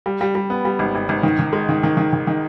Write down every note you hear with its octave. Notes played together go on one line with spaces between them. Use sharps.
G3
G3
G3
B3
G3
G#1
G#1
G#1
D#3
D#3
G#3
D#3
D#3
D#3
D#3
D#3